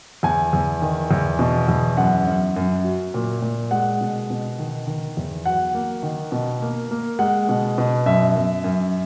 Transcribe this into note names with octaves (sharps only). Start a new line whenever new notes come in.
E2 G#5
E2
D#3
E2
B2
E2
F#2 F#5
F#2
F#2
F#3
A#2
A#2
G#3 F#5
B2
B2
D#3
D#3
E2
F#3 F#5
A#3
D#3
B2
A#3
A#3
G#3 F#5
B2
B2
F#2 E5
F#2
F#2